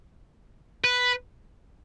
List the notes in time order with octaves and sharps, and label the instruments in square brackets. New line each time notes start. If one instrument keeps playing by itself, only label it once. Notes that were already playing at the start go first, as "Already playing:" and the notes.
[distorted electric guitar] B4